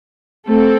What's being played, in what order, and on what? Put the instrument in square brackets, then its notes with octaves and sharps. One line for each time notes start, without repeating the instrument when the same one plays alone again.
[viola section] A3 C4 A4